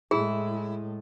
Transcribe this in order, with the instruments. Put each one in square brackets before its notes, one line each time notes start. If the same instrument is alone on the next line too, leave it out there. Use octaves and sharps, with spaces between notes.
[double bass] A2 G#3 [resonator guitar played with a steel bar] E4 [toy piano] G#4